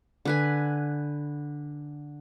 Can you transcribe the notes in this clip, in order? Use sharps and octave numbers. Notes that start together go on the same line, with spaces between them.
D3 B4 G#5